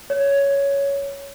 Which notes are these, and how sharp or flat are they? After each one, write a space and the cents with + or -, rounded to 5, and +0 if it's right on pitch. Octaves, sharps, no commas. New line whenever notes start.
C#5 +10